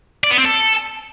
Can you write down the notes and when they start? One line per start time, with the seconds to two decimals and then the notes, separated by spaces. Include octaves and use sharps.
0.24 D5
0.31 B3
0.38 C4
0.45 A4